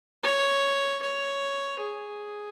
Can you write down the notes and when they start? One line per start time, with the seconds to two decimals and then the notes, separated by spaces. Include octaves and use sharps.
0.24 C#5
1.02 C#5
1.80 G#4